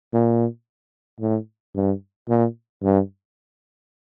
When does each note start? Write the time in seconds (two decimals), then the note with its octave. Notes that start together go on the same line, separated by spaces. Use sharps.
0.13 A#2
1.20 A2
1.75 G2
2.29 A#2
2.83 G2